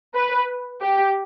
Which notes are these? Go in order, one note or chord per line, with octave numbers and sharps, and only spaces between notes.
B4
G4